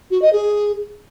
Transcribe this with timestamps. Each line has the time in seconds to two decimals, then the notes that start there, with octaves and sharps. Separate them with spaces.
0.11 F#4
0.22 D#5
0.33 G#4